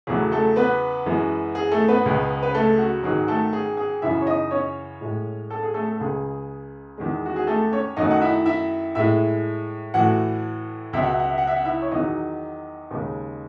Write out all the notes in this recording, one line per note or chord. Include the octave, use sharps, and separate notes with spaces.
E2 C#3 F#3 A3 G#4
A3 A4
B3 B4
F#2 E3 G#3
G#4
A3 A4
B3 B4
C#2 C#3 G#3
B4
A3 A4
F#4
G#2 D#3 F#3 G#4
A3 A4
G#4
G#4
F#2 C#3 E3 E4 E5
C#5
D#4 D#5
C#4 C#5
A2 G#3
A4
G#4
A3 A4
A4
C#2 C#3 G#3 G#4
E2 D#3 G#3
F#4
G#4
A3 A4
C#4 C#5
F#2 D#3 F#3 A3 D#4 D#5
F#5
E4 E5
E4 E5
A2 G#3 E4 E5
A2 E3 A3 F#4 F#5
C#2 B2 F#3 E5
F#5
E5
F#5
E5
F#5
E5
F#5
E4 E5
C#5
E2 D#3 F#3 D#4 D#5
D#2 C#3 G#3